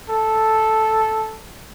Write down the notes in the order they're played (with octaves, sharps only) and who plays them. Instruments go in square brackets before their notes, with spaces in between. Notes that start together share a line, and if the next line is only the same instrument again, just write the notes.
[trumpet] A4